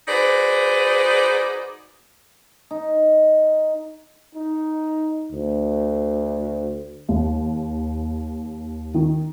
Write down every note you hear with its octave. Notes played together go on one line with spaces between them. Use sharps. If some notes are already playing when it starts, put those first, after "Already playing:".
D#4 F#4 G#4 B4 C5 D5
D#4
D#4
D2
D#2
D#3